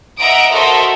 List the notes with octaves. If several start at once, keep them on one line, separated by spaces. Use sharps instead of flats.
D#5 E5 F#5 A#5 D#6 D7
F#4 A4 A#4 C5 D#5 E5